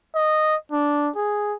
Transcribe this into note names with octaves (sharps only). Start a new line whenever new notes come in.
D#5
D4
G#4